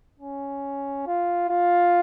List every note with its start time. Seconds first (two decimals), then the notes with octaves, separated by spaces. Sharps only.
0.20 C#4
1.07 F4
1.50 F4